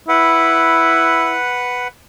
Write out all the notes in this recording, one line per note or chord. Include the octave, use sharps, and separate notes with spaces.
E4 B4 F#5